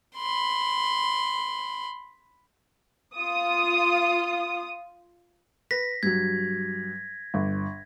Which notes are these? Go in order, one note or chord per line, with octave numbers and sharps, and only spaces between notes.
B5 C6
F4 D#6
B4 A#6 B6
G2 F#3 G#6
G1